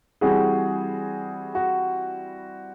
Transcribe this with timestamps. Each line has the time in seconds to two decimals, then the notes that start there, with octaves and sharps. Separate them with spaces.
0.21 E3 G3 C4 F#4 G#4
1.55 F#4